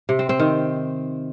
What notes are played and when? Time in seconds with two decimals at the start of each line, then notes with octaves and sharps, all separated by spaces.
0.09 C3
0.19 C4
0.29 C4
0.39 D#3